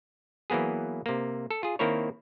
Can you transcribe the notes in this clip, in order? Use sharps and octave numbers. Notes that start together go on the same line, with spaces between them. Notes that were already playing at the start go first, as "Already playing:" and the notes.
E3 F#3 A#3 B3 G#4
C3 A#3
A4
F4 G#4
D#3 A#3 C4 E4 A#4 C#5